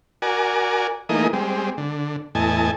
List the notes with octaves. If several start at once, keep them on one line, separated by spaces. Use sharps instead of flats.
F#4 A#4 D5 G#5
E3 A3 A#3 D#4 G#4 D#5
G3 G#3 C4
D3
E2 A2 D#5 G#5 A5